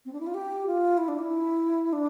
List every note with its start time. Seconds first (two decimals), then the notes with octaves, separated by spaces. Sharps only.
0.05 C4
0.13 D4
0.20 E4
0.27 F4
0.34 G4
0.67 F4
0.98 E4
1.08 D4
1.19 E4
1.93 D4